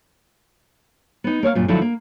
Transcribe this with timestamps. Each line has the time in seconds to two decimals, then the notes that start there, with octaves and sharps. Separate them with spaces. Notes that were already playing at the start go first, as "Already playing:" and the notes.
1.24 B3 D#4
1.43 A#3 C#5 D5 F5
1.55 F#2 A#2
1.68 D3 F3 F#3 D#4 E4
1.82 A#3